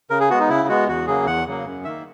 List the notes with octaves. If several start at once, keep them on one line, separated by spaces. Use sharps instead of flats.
C#3 A#4
G#4
G#3 B3 F#4
D#4
C#3 E4
G#3 B3 F#4
E2 F#4
C#3 F#3 A#3 G#4
E2 F#5
C#3 F#3 A#3
F#2
D#3 A#3 E5